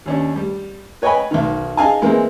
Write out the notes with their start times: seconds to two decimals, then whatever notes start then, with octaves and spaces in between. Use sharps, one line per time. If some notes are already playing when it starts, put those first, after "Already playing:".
0.06 D#2 C#4 D4
0.36 G3
1.02 B4 C#5 D#5 G5 G#5 B5
1.31 B1 D#3
1.77 D#4 G#4 F5 G#5 A5
2.02 E3 G#3 A#3 C4 A#4